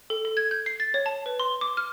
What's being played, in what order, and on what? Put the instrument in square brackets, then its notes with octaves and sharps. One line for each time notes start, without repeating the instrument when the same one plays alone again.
[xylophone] A4
A4
G#6
G6
C7
A6
C#5
A5
B4
C6
D6
F6